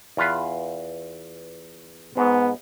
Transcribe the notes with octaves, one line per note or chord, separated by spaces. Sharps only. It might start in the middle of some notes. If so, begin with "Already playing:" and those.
E2 F4 B4
G#2 B3